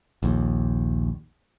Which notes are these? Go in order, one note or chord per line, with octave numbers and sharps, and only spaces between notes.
A#1 D#2